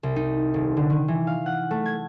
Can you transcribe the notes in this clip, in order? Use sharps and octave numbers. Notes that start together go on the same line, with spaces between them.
C2
D#4
D#1
D3
D#3
E3
F5
F#5
A3
G#6